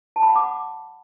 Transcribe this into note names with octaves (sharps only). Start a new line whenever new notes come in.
A5
B5
F#5
D6